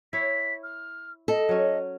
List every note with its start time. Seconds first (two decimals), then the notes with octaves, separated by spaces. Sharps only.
0.13 E4 C#5 B6
0.63 F6
1.28 A4 D#5
1.49 F#3 C#4